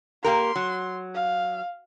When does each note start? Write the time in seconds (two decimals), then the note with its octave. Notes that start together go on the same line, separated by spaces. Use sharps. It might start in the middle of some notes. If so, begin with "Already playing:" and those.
0.24 A#3 G4 A#4 C6
0.56 F#3
1.15 F5